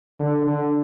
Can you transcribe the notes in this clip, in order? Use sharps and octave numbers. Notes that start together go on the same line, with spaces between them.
D3
D3